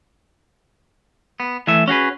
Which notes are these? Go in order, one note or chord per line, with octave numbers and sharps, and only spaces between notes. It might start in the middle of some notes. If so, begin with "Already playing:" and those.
B3
E3 A3 E5
C#4 F#4 G#4 B4